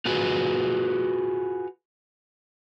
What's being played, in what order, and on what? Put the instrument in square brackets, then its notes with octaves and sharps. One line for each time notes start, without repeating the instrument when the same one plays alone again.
[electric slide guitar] F4 F#4 G#4 B4